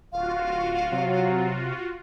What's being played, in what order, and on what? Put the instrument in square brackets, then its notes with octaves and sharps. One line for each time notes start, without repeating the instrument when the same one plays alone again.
[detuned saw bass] D1 [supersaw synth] F4 F#4 [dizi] F5
[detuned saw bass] C3 [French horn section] F#3